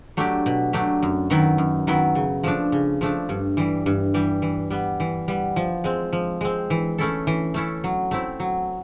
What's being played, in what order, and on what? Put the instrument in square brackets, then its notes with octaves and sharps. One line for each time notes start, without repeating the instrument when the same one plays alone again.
[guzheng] F#3 A3 D4 G4
B2
F#3 A3 D4 G4
F#2
D#3 F#3 B3 E4
F#2
D#3 F#3 B3 E4
C#3
F3 A3 D4
C#3
F3 A3 D4
G2
E3 G3
G2
E3 G3
E3
G3 B3
E3
G3 B3
F3
G#3 C4
F3
G#3 C4
E3
A3 C#4 E4 A4
E3
A3 C#4 E4 A4
F#3
A3 C4 E4
F#3